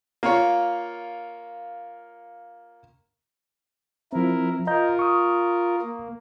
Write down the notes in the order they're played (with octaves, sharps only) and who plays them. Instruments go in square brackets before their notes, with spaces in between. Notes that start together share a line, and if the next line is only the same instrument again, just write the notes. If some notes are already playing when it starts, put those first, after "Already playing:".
[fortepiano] A#3 F4 C#5
[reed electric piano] F3 C4 [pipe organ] E4 A#4
[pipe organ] F4 A#4 [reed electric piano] D#5 A#5 G6
[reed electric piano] C#6 D#6
[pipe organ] A#3